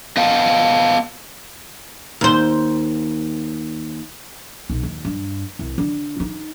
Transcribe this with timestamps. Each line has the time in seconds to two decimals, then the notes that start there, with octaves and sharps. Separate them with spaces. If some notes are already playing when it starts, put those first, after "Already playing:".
0.17 B3 D#5 F5 G5 A5
2.21 D#2 C5
4.69 B1
4.83 D#2
5.05 G2
5.59 C2
5.78 D3
6.20 D#4